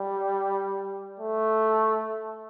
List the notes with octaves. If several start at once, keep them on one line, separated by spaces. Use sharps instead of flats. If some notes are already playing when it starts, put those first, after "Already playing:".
Already playing: G3
A3